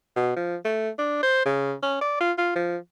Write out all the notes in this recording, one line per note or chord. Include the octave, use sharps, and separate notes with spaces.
B2
F3
A3
D4
C5
C#3
C#4
D5
F4
F4
F3